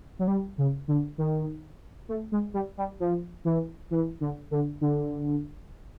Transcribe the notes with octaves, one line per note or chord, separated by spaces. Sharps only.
F#3
G3
C#3
D3
D#3
A3
G#3
G3
G3
F3
E3
E3
D3
D3
D3